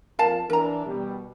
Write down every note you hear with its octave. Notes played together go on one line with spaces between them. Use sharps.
F2 A#2 A#4 F5 A5
E3 D4 A#4 A#5
B2 G3